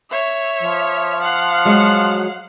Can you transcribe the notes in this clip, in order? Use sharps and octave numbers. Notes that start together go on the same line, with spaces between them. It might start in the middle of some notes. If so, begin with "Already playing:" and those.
C#5 E5
F3
F5 F#5
F#3 G#3 F#4